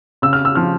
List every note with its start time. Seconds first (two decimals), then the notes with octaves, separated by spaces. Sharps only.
0.22 C#3 E6
0.33 F6
0.45 E6
0.55 F3 F6